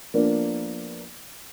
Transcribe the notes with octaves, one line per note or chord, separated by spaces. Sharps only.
F3 A#3 B3 D4 A#4